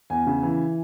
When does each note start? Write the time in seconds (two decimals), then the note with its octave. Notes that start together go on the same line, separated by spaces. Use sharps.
0.10 E2 G#5
0.27 C#3
0.43 E3